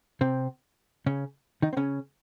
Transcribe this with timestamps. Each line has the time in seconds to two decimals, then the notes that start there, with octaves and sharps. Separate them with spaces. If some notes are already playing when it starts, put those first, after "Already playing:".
0.21 C3 C4
1.06 C#3 C#4
1.62 D#3 D#4
1.73 C4
1.77 C#3 C#4